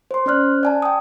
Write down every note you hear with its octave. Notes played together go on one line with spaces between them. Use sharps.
C5 C6
C#4 C5 D5 F6 F#6
D5 G#5 A5
G5 D#6